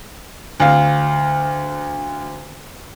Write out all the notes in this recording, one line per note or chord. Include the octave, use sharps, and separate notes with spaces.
D2 F5